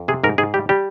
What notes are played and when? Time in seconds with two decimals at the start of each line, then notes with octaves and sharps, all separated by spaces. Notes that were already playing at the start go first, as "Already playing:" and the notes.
Already playing: F2
0.08 C3 G#4
0.24 G#2 A#4
0.38 G#2 G#4
0.54 G3 G4
0.69 G3 G4